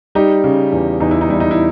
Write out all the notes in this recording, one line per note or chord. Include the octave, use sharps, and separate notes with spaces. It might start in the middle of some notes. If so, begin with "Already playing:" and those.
G3 D#4 G4
C#3
E2
E2 D#4
E4
D#4
G3 E4
D#4
E4